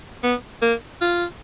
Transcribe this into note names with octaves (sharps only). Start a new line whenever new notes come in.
B3
A#3
F4